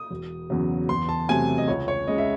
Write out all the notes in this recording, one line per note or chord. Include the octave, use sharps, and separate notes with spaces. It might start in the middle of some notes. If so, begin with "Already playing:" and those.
Already playing: D#6
E1
E2 C#3 F#3
E2 C6
A5
C3 F#3 A3 G#5
D#5
C#2 C#5
C#5
C#3 G#3 D#5
E5